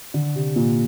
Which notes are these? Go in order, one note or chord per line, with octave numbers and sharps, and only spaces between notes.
D3
C3
A#2